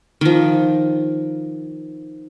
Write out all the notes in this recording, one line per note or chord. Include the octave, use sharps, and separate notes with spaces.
D#3 F3